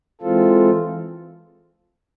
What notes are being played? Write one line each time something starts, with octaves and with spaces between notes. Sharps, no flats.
E3 G#3 C4 F4 A4